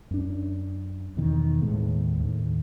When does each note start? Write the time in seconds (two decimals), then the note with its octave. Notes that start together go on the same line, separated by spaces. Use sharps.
0.11 F#2 D4
1.17 E2 B2 D#3
1.61 D#2 A2 G#3 B3
2.19 D#2 A2